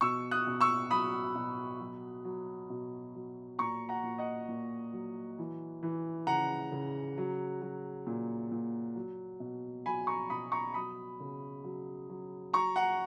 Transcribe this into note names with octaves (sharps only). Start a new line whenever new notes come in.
B2 C#6 E6
D#6 F#6
B2
C#6 E6
F#3 B5 D#6
B2
F#3
F#3
B2
F#3
A#2 A#5 C#6
F#5 A#5
A#2
D#5 F#5
A#2
F#3
E3
E3
C#3 F#5 A#5
C#3
F#3
F#3
A#2
A#2
F#3
B2
F#3 G#5 B5
A#5 C#6
B2 B5 D#6
A#5 C#6
F#3 B5 D#6
C#3
F#3
F#3
F#3 A#5 C#6
F#5 A#5